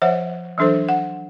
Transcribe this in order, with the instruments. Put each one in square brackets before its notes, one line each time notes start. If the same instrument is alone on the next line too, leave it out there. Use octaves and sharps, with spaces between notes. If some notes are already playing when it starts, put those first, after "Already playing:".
[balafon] F3 C5 C#5 E5 F#5
E3 F#3 D4 A4 C5
F#5